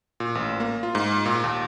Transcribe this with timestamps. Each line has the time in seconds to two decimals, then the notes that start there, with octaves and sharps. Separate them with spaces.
0.20 A#2
0.35 A1
0.60 A#3
0.83 F4
0.95 G#2
1.26 A#2
1.44 D#2